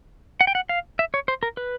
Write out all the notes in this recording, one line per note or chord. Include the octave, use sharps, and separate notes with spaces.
F#5
G5
F#5
F5
E5
C#5
C5
A#4
B4